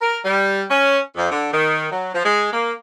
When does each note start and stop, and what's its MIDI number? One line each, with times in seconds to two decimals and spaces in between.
0.01 0.19 70
0.24 0.62 55
0.70 0.99 61
1.16 1.27 41
1.31 1.50 50
1.52 1.87 51
1.91 2.09 54
2.13 2.24 53
2.25 2.49 56
2.52 2.72 58